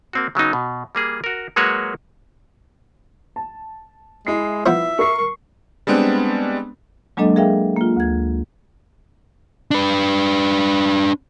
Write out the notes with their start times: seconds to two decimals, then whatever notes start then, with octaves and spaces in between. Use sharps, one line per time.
0.13 A#3 C4 F#4
0.35 C#3 F#3 B3 D#4
0.53 B2
0.95 G3 A#3 G#4
1.24 F#4 A#4
1.56 F#3 G#3 A#3 F#4 B4 C#5
3.36 A5
4.27 G#3 E4 C7
4.66 E3 F3 B3 E5
4.99 A#4 C#6 C7
5.87 G3 G#3 B3 C4 D4
7.17 F#3 G#3 A#3 D4 A4 D#5
7.36 G#4 A#4 E5 F5 G5
7.77 A#3 F4
7.97 D2 G#6
9.71 D4 B4